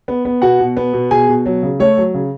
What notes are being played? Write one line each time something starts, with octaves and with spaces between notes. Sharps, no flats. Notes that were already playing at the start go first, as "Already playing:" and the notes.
B3
B3
B2 F#4 F#5
B2
B3
B2
B2 G#4 G#5
B2
F#3
C#3
A3 C#5
F#3
C#3